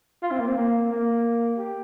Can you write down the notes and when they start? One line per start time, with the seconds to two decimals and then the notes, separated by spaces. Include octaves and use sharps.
0.23 F4
0.32 C4
0.40 A#3
0.48 C4
0.57 A#3
0.91 A#3
1.58 G4